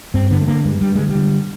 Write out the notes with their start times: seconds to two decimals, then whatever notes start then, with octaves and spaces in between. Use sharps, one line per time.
0.14 G2 C4
0.31 D3 B3
0.42 A3
0.47 D3 A#3
0.65 G2 G#3
0.81 G2 G3
0.95 D3 G#3
1.09 G3
1.15 D3